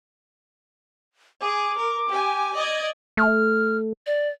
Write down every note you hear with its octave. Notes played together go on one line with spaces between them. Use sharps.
G#4 D6
A#4
G4 G#5
D5 D#5 G#6
A3 F6
D5